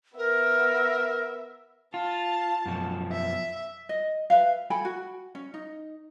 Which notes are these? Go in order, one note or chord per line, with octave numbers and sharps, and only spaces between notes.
B3 A#4 E5
F4 A5
F#2 B2 F3
E5
D#5
B4 E5 F5
A4 G5 G#5 B5
F#4
C#4
D#4